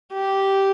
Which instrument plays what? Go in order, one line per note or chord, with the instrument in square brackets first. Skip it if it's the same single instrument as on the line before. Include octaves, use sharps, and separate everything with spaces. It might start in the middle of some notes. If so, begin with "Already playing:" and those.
[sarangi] G4